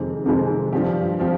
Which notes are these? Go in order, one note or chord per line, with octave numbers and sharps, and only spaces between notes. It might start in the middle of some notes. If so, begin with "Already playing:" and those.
Already playing: F2 C3 D#3 G#3 C4
F2 C3 D#3 G#3 C4
G2 F3 C4 G4
F3 C4 G4